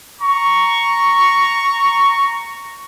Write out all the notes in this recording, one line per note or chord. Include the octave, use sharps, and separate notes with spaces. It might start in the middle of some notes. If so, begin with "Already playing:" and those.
A#5 C#6